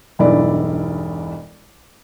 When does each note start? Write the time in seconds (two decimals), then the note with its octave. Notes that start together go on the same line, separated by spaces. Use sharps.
0.19 E1 B1 G2 E4 D5